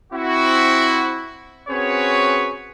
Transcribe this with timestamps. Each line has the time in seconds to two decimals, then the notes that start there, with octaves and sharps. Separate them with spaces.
0.12 C4 E4 F#4
1.69 C4 C#4 F#4 G#4 B4 C#5